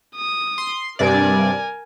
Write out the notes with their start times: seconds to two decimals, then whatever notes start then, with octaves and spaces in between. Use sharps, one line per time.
0.16 D#6
0.58 C6
0.99 G2 C3 A#4 D5 G#5